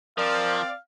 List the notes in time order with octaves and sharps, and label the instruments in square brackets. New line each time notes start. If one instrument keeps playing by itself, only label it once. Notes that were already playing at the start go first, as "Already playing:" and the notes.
[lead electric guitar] F3 [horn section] C4 D5 [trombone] A#4 [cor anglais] F5